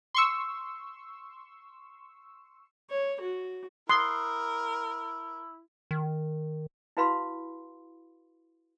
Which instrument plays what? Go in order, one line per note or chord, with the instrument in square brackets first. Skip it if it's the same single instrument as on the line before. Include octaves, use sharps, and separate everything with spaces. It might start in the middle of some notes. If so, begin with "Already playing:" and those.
[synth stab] C6 C#6 E6
[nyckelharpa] C#5
F#4
[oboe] E4 [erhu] A#4 [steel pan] C6 [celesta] D#6 F#6
[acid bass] D#3
[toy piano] E4 F#4 B4 F5 B5 C6